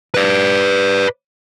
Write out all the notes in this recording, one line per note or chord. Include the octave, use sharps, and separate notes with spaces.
B4 D5